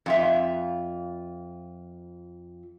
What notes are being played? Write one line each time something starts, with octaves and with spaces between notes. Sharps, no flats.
F2 F4 E5